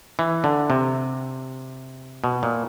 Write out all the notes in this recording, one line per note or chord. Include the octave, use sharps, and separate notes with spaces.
E3
D3
C3
B2
A#2